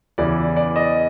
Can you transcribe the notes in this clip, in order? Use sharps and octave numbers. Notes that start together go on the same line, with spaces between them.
E2 C#3 E3 D5
D5
D#5